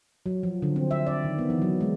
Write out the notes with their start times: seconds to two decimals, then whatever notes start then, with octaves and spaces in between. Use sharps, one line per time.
0.26 F#3
0.43 F3
0.62 D3
0.76 C4
0.91 E5
1.07 D5
1.24 D#3
1.38 B3
1.50 E3
1.62 F#3
1.81 G#3